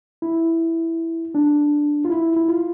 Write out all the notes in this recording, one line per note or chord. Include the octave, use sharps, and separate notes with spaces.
E4
D4
F4
E4
E4
F4